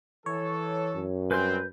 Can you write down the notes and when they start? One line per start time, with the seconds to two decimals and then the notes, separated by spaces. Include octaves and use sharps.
0.26 E3 A4 C#5
0.95 F#2
1.31 G3 C4 B4 G#5 C6 G6